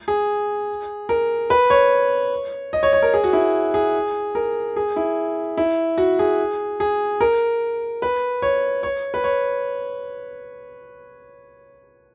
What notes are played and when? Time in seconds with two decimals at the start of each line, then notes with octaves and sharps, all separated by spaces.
0.08 G#4
1.09 A#4
1.50 B4
1.70 C#5
2.73 D#5
2.83 C#5
2.93 C#5
3.02 A#4
3.14 G#4
3.24 F#4
3.33 E4
3.74 G#4
4.35 A#4
4.76 G#4
4.96 E4
5.58 E4
5.98 F#4
6.19 G#4
6.80 G#4
7.21 A#4
8.02 B4
8.42 C#5
8.83 C#5
9.14 B4
9.24 C#5